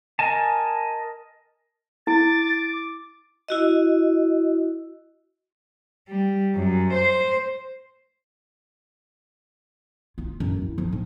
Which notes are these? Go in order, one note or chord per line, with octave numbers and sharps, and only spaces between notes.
A#4 D#5 G#5 A5
E4 D6 A6
E4 F#4 D#5
G3
F#2
C5
F4
F#2
E4
F3
G#2